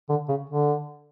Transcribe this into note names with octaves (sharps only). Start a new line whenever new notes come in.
D3
C#3
D3